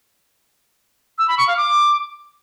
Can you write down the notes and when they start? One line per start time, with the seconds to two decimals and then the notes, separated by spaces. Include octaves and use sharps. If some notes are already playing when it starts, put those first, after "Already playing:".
1.18 E6
1.28 B5
1.38 C#6
1.47 F5
1.57 D6